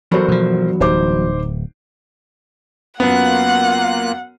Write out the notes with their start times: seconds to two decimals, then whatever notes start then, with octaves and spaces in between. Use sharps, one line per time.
0.12 E2 G2 F#3 A4 A#4 C5
0.28 B2 F3
0.80 D1 D#4 C5 D6
3.00 F#2 A#3 B3 F4 F#5 F#6